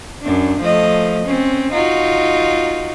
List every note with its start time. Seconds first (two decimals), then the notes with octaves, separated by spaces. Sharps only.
0.21 F#2 D4
0.60 F3 A3 D#5
1.25 C4 C#4
1.72 D#4 F4 F#4